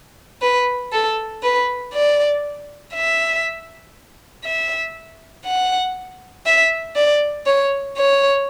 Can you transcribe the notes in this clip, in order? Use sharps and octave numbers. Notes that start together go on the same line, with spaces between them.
B4
A4
B4
D5
E5
E5
F#5
E5
D5
C#5
C#5